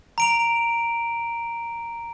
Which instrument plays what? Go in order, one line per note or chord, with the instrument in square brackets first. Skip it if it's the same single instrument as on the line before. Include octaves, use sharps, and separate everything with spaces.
[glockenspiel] A#5 D7 F7